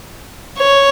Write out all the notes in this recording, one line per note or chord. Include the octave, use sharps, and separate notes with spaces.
C#5